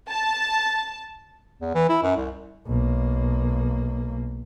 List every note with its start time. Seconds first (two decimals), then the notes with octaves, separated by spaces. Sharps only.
0.10 A5
1.61 E2
1.75 E3
1.89 E4
2.02 F#2
2.16 C2
2.67 B1 A#3